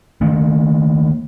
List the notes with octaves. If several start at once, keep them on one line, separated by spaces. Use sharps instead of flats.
D#3 A3 A#3